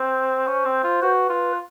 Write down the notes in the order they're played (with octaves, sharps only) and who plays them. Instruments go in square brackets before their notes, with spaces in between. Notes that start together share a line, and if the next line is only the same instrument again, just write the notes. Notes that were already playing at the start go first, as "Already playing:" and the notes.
Already playing: [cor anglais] C4 [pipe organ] C5
[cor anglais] C#4
C4
F4
[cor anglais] F#4 [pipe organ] B4
[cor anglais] F4